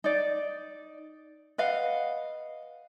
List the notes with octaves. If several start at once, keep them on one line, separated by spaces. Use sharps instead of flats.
D#4 D5
B4 D#5 F5 F#5